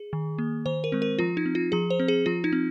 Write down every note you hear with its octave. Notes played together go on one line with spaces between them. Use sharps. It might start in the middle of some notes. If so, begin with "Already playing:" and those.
Already playing: G#4
D#3
A#3
D#3 C5
A#4
G#3 C4
A#4
F3 F4
D#4
C4
F4
F3 G#4
C5
C4
G#4
F3 F4
D#4
C4